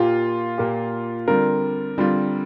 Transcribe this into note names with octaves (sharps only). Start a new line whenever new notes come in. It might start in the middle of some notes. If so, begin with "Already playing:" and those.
Already playing: A#2 A#3 F4 G4
A#2 A#3 G4
D3 G3 C4 F4 A#4
D3 G3 C4 F4